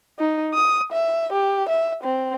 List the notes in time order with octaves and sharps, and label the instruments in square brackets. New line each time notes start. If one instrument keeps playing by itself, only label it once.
[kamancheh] D#4
D#6
E5
G4
E5
C4